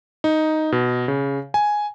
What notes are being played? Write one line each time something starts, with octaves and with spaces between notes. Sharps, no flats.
D#4
B2
C#3
G#5